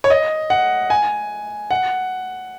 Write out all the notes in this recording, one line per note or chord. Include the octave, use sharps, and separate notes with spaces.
C#5
D#5
F#5
G#5
F#5